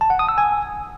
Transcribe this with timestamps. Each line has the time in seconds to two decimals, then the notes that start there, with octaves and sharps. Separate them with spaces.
0.01 A5
0.10 F#5
0.19 D#6
0.29 E6
0.38 G#5